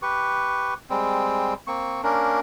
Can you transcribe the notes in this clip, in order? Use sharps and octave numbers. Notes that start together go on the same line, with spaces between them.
G4 B4 C#6
G3 G#3 C4
A#3 C4 C#6
A#3 C#4 D4 A#4